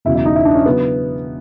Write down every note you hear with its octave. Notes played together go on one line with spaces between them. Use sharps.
E1 E2 C#3 F#3 E4
E4
D#4
E4
D4
C#4
C#3 F#3 B3